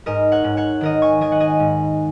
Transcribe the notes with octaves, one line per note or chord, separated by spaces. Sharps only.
G#2 A#4 D#5
C#5 F#5
G#2
C#5 F#5
D#3 A#4 D#5
G#5 C#6
D#3 D#5 G#5
F#5
D#5 G#5
G#2